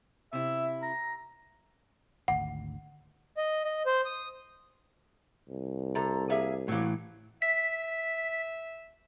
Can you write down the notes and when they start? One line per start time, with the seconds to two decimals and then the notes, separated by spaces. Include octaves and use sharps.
0.33 C3 E4 E5
0.83 A#5
2.28 G#1 D2 F#5
3.37 D#5
3.65 D#5
3.86 C5
4.05 D#6
5.49 C2
5.95 C3 A4 A#5
6.30 A#3 G#4 E5
6.68 A2 E3 F#3 A#3
7.42 E5 B6